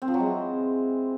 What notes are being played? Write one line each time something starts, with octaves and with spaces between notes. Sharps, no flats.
C4
F3
F#3
G#3
E3